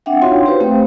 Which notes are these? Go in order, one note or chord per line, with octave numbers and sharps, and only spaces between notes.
C4 D4 E5 F#5 G5
D#4 F4 F#4 C#5 F5 C6
G4 B4 C5
A3 C4 F5 G5